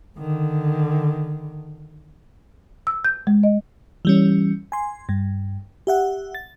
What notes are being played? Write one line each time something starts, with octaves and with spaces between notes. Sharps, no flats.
D3 D#3
E6
G6
G#3
D#5
E3 G3 C#4
G#5 C6
G2
G4 E5 F#5
A6